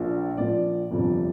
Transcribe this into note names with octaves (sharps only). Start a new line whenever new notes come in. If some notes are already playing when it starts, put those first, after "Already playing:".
Already playing: A#1 A#2 F3
A#1 A#2 F3 D5
G1 F2 C3 F3